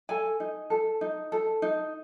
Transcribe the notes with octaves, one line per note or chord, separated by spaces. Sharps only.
A4 G#5
D#4
A4
D#4
A4
D#4